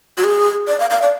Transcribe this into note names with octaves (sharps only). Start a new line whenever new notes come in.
F#4
G#4
D5
F5
F5
D5